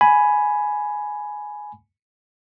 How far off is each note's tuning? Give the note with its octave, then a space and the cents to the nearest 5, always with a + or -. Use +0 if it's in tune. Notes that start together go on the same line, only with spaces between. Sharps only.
G#5 +10 B5 +0